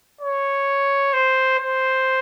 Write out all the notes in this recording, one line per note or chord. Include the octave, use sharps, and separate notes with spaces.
C#5
C5
C5